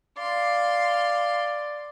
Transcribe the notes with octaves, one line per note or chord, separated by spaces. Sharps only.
D5 F5 C6